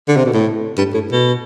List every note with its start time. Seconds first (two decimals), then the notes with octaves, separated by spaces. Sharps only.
0.08 D3
0.17 C3
0.25 B2
0.34 A2
0.78 G2
0.94 A2
1.12 B2